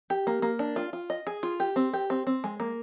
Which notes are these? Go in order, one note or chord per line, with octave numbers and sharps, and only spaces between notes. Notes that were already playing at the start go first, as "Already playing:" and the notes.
G4
A#3
A#3
D4
F4
F4
D#5
G#4
F4
G4
C4
G4
C4
C4
G#3
A#3